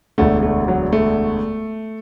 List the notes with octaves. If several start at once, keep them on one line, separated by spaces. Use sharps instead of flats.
E1 D2 D3 A3
A3
F#3
A3